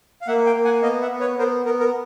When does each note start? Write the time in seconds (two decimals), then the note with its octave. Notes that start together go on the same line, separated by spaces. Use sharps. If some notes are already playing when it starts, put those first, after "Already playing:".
0.22 F5
0.27 A#3 E5 F#5
0.46 F5 G5
0.56 A#3
0.65 F#5 G#5
0.82 B3 D#5 F5
1.01 E5 F#5
1.11 B3
1.20 B4 C#5
1.38 B3 A#4 C5
1.65 B3 A#4
1.80 A#4